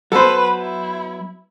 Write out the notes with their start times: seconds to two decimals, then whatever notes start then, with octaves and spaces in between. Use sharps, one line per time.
0.12 F#3 B3 A4 B4 C5
0.61 E4